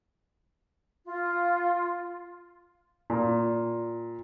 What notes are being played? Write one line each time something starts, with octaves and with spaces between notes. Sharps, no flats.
F4
A#2